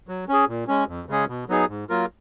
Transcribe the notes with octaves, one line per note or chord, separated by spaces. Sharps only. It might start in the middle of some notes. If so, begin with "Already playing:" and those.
F#3
C#4 G#4
A#2
G#3 C#4
F2
C#3 G#3 C#4 G#4
B2
F#3 B3 D#4 G#4
G#2
F#3 A#3 F4 A#4